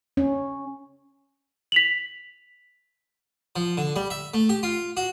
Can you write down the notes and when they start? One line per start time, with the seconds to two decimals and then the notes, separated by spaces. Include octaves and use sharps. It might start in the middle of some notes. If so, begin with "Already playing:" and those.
0.17 C#4
1.72 B6 F7 F#7
3.56 F3
3.77 D3
3.96 G3
4.10 E5
4.34 A3
4.49 G4
4.63 F4
4.97 F#4